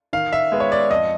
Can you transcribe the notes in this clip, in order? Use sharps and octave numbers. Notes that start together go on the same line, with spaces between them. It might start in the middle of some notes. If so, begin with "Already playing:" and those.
D#3 F5
E5
G#3 B3
C#5
D5
F2 D#5